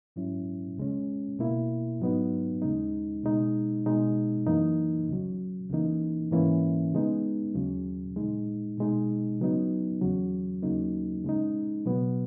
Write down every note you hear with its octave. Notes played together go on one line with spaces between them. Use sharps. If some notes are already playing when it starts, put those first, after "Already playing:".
G#2 F#3 C#4 E4
C#2 C#3 G#3 C#4
B2 A#3 E4
G#2 F#3 B3 D#4
D#2 C#3 G#3 D#4
B2 G#3 D#4
B2 G#3 D#4
F#2 E3 A#3 D#4
C#2 C#3 F#3
C#2 C#3 E3 A#3 D#4
G#2 E3 A#3 C#4 E4
C#3 G#3 B3 D#4
D#2 C#3 F#3
A#2 G#3 D#4
B2 G#3 D#4
C#3 F#3 B3 D#4
E2 C#3 F#3
D#2 C#3 F#3 A#3 D#4
C#3 G#3 D#4
B2 F#3 B3